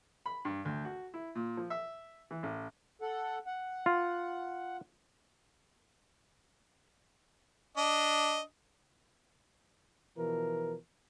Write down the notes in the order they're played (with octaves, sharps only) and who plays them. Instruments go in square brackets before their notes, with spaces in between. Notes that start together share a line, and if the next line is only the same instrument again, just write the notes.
[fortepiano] B5
G2
D2
F#4
E4
A#2
F3
E5
E3
A1
[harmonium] A4 F#5
F#5
[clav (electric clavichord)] F4
[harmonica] D4 D#5
[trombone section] B2 E3 F3 A#4